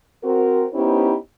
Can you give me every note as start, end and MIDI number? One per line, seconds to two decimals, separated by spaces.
0.24 0.65 60
0.24 0.65 66
0.24 0.65 70
0.74 1.15 59
0.74 1.15 61
0.74 1.15 63
0.74 1.15 64
0.74 1.15 67
0.74 1.15 72